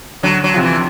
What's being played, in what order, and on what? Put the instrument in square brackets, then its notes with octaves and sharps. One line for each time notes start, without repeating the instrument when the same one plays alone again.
[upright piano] D2 [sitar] F#3
[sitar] F#3
[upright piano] C3 F3
[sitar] E3